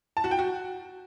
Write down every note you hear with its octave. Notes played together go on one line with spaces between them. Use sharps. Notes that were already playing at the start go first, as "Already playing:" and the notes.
A5
F#4
G5
F#4